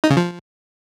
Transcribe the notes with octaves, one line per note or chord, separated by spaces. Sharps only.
D#4
C#3
F3